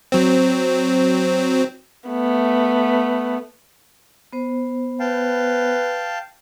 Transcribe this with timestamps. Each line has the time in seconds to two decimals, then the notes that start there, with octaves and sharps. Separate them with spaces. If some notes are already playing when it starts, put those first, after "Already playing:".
0.12 F#3 C4
2.09 A3 B3
4.33 B3 C5
5.00 B4 F5 G5 A5